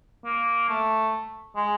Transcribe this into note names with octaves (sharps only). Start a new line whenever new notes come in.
A#3
A3
G#3